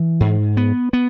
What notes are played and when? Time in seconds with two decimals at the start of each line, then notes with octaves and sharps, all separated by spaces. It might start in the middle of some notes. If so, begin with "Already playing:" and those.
Already playing: E3
0.20 G#2
0.57 B3
0.93 B3